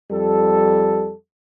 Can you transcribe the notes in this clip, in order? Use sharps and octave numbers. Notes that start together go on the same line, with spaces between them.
F2 G3 A4